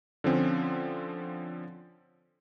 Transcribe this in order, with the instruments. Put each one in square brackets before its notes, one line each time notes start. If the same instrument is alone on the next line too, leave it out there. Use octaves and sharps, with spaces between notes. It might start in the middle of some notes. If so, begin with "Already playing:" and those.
[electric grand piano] D3 F3 C4 C#4